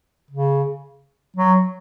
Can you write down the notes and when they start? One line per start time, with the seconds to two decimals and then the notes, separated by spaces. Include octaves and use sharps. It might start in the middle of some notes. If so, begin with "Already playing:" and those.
0.31 C#3
1.37 F#3